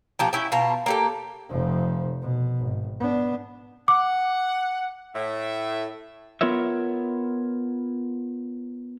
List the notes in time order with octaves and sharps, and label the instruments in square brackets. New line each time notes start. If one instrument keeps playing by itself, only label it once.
[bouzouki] A#2 F3 G4
C#4 E4 G5
B2 F4 A5 A#5
A#3 G4 A4
[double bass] F1 F3
B2
G#1
B3 D4
[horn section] F#5 [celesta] D6
[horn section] A2 E5
[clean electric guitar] B3 F4 A#4 C#5 E5